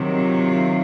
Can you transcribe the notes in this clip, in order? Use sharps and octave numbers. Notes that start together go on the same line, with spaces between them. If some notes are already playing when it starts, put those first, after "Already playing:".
Already playing: C3 D#3 F#3
F4